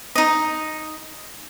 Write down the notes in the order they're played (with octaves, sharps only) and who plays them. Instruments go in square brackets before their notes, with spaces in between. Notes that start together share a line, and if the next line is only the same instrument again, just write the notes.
[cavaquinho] D#4 D#5